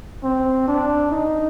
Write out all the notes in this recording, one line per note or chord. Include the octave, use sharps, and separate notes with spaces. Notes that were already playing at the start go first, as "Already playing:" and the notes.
C4
D4
D#4